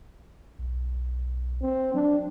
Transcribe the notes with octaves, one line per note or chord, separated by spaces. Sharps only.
B1
C4
F#3 D4